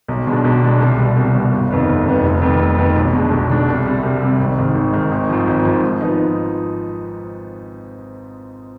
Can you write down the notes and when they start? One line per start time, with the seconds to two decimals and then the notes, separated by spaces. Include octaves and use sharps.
0.08 B1
0.27 B2 G#3 D4
0.44 B1
0.62 B2 G#3 D4
0.81 C2
0.98 B2 G3
1.17 C2
1.35 B2 G3
1.53 G1
1.70 F2 D#3 B3
1.89 G1
2.05 F2 D#3 B3
2.23 F1
2.42 F2 D#3 B3
2.60 F1
2.77 F2 D#3 B3
2.96 B1
3.13 B2 G#3 D4
3.31 B1
3.50 B2 G#3 D4
3.68 C2
3.86 C3 G3
4.03 C2
4.22 C3 G3
4.39 G#1
4.58 G#2 D#3
4.75 G#1
4.93 G#2 D#3
5.11 G#1
5.29 G#2 F3
5.47 G#1
5.65 G#2 F3
5.84 G#2
6.01 F3 B3 D#4